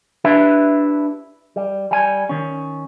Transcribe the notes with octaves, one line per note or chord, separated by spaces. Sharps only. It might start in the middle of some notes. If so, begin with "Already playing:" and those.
D4 E4 G4 B4 E5
G3
G3 G#5
D#3 C#4